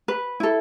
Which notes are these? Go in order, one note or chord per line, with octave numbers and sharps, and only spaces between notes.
B4
E4 A4